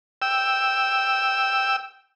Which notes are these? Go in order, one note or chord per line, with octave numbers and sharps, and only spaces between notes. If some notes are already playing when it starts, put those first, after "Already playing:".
G5 E6